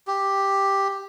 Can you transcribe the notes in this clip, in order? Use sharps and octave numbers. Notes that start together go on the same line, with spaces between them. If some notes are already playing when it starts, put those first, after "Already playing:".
G4